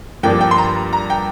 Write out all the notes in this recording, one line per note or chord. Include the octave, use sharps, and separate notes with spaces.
G2 F3 A#3 D4 G5
G5
C6
A#5
A#5
G5